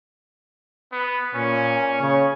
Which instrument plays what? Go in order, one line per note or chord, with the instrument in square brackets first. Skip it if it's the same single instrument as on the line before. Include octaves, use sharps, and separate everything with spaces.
[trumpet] B3
[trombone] A#2 [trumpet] C#4
[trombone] C#3 [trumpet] C#5